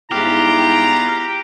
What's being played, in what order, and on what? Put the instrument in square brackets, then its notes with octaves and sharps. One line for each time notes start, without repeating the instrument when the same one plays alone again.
[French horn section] G#2 G3 E4 [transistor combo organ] B3 F4 F5 [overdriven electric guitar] G4 [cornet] A#5